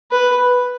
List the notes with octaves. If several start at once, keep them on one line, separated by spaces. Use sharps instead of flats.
B4